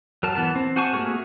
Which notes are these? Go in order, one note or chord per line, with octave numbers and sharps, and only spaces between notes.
F#3 A#4 A5
E3 B3 A5
C4
F#4 C5 G#5 A5 C#6
A3 A#3 F#4 G#4 A#4